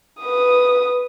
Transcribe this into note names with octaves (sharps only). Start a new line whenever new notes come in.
B4 D#6